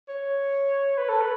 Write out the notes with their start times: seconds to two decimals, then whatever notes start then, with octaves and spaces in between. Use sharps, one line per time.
0.09 C#5
0.98 B4
1.09 A4
1.21 B4